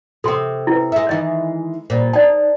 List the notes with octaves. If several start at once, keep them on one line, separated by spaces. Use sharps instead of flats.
C3 C4 A4 C6
E4 B4
G#3 E5
D#3 E3 G#3 D#5
A#2 G3 C5
D#4 D5 A5